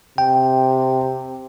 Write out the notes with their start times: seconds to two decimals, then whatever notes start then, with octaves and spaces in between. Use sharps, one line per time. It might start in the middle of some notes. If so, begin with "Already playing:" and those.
0.18 C3 G5